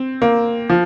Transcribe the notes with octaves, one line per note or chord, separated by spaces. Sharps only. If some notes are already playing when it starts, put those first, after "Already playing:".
Already playing: C4
A#3
F3